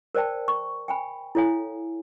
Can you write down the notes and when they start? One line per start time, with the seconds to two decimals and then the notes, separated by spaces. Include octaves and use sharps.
0.15 A#4 C5 D5 G5 A5
0.48 C#6
0.88 G5 G#5 B5
1.35 E4 A4 C#5 F5 G#5